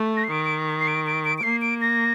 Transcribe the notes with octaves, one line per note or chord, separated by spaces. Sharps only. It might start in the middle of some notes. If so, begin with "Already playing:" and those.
Already playing: A3
A#6
C7
D#3 D7
D7
C7
D7
D7
D7
D7
A#3 C7
D7
A#6